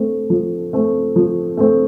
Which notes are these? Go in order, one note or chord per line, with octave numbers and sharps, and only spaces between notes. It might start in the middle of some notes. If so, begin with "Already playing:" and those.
Already playing: A3 C4
F3
A3 C4
F3
A3 C4